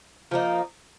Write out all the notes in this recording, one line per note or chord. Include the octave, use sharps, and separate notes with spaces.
F3 A#3 D#4